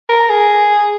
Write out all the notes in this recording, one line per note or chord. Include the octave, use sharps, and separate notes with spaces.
A#4
G#4